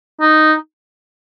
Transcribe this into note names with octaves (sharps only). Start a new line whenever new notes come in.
D#4